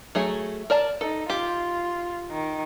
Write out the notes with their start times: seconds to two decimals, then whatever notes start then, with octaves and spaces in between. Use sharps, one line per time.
0.15 F#3 A3 G#4
0.70 A#4 D5 A5
1.01 D#4 A4
1.30 F4 G4
2.31 D#3